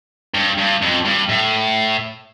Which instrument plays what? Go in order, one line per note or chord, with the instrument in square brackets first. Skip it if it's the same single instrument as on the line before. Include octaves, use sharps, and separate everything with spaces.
[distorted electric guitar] G2
G2
F2
G2
A2